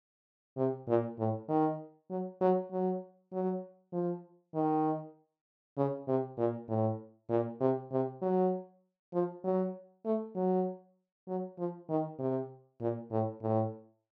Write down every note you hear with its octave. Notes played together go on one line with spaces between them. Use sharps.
C3
A#2
A2
D#3
F#3
F#3
F#3
F#3
F3
D#3
C#3
C3
A#2
A2
A#2
C3
C3
F#3
F3
F#3
A3
F#3
F#3
F3
D#3
C3
A#2
A2
A2